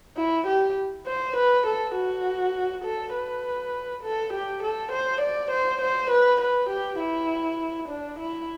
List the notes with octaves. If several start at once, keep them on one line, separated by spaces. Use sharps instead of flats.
E4
G4
C5
B4
A4
F#4
A4
B4
A4
G4
A4
C5
D5
C5
C5
B4
B4
G4
E4
D4
E4